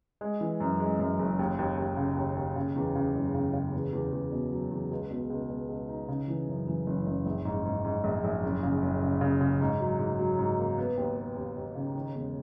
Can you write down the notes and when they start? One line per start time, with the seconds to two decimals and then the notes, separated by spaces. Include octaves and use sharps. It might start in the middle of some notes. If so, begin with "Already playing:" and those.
0.21 G#3
0.41 E3
0.60 F#2
0.80 G#3
0.99 F#2
1.19 F#1
1.39 D#2
1.59 D#2
1.78 D#2
1.97 C#3
2.17 D#2
2.37 D#2
2.56 C#3
2.76 E2
2.95 C#3
3.15 F#1
3.35 C#3
3.53 C#3
3.74 E2
3.93 E2
4.12 E2
4.32 B2
4.52 F#3
4.71 E2
4.91 C#2
5.11 B2
5.30 C#2
5.50 B2
5.69 C#2
5.89 D#4
6.08 C#3
6.28 E3
6.48 F#2
6.67 E3
6.87 F#1
7.06 F#1
7.26 A#1
7.45 G#2
7.65 G#2
7.85 G#2
8.04 A#1
8.24 A#1
8.43 F#1
8.63 C#3
8.82 F#1
9.02 C#3
9.21 C#3
9.41 C#3
9.61 G#2
9.80 F#3
9.99 G#2
10.19 F#3
10.39 G#2
10.58 A#3
10.78 B3
10.97 D#2
11.17 B3
11.37 D#2
11.57 D#2
11.75 C#3
11.95 D#3
12.15 E1